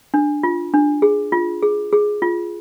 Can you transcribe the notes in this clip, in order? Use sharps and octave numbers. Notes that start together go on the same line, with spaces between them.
D4
F4
D4
G#4
F4
G#4
G#4
F4